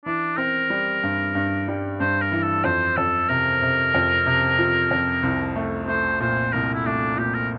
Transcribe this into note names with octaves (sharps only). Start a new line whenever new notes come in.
E3 D4
C4 A#4
G3
G2
G2
G3
G2 C5
A#4
E3
A4
F2 C5
F2 A4
C3 A#4
C3
F2
C3
F3
F2
C2
A3
A3 C5
A#2 C5
C2 A#4
E4
A3 D4
A#2 G4
A#4